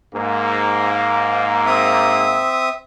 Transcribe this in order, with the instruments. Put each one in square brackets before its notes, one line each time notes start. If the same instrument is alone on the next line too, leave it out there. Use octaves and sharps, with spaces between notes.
[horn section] G#2 A#3
[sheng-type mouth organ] C4 E5 D#6